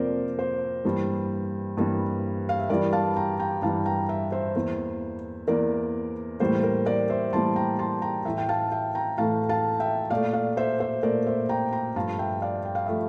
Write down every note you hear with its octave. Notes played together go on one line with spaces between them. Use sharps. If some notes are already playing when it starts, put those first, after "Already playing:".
Already playing: F2 C3 F3 A#3 A#4 C5 D5
C5
G2 E3 G3 A#3
G2 E3 G3 A#3
F5
E5
G2 E3 G3 A#4 D5
F5 A5
G5 A#5
G5 A#5
G2 E3 G3 F5 A5
G5 A#5
E5 G5
C5 E5
E2 E3 A#3
E2 E3 A#3 A#4 D5
A2 E3 G3 A#3 C5
A#4
A#4 D5
C5 E5
A2 E3 G3 A#3 A5 C6
G5 A#5
A5 C6
G5 A#5
A2 E3 A3 E5 G5
G5
F5 A5
E5 G5
G5 A#5
A2 E3 A3 F5 A5
F5 A5
E5 G5
A#2 A3 D5 F5
D5 F5
C5 E5
C5 E5
A#2 A3 A#4 D5
C5 E5
G5 A#5
G5 A#5
G2 F3 A3 F5 A5
E5 G5
D5 F5
G5
F5
F3 A3 E5